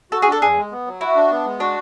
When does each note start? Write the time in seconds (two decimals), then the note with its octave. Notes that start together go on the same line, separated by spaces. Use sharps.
0.12 F#4 A4
0.22 G#4
0.28 D4 A4
0.41 E2 G#4
0.56 G#3
0.72 B3
0.86 F#3
1.01 E4 F#4
1.16 D4
1.31 B3
1.46 G#3
1.60 D4 F#4